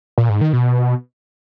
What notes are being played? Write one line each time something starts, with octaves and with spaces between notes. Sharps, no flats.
A#2
G#2
D#3
B2